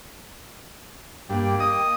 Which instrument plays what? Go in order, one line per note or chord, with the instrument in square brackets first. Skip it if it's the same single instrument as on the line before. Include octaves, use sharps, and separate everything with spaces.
[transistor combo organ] G2 [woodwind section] A#3 [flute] G5
[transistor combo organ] D#5 D#6